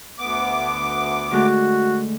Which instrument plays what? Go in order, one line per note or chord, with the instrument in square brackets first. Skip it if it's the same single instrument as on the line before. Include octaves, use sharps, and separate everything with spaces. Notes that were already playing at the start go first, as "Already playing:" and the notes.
[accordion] D2 B3 D6
[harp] D3 G#3 A3 [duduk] F#4